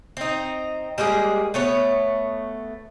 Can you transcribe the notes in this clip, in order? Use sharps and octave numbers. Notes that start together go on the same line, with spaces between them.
C4 D#4
G3 G#3 A#3 G#4
A3 B3 C#5